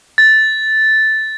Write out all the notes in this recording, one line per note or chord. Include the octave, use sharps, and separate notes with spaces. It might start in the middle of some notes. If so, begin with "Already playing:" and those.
A6